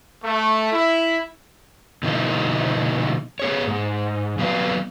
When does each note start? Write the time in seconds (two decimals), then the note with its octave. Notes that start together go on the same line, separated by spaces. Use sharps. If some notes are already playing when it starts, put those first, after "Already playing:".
0.23 A3
0.72 E4
2.03 B2 D3 F3 A#3 D#4 E4
3.39 B3 G#4 C#5
3.67 G#2
4.39 F#3 B3 B4 D5 F5